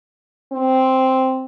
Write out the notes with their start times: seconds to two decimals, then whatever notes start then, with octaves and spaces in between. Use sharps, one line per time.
0.52 C4